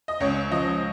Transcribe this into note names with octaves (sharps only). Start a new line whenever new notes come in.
D#5
C#2 C#5
F3 D#5